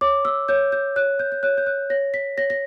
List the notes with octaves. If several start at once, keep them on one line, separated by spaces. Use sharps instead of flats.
C#5 D6
E6
C#5 G6
G6
C#5 F#6
G6
G6
C#5 F#6
G6
F#6
C#5 A#6
B6
C#5 A#6
A#6